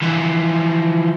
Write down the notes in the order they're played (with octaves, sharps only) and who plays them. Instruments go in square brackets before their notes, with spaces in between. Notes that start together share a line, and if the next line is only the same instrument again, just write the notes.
[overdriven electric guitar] E3 F3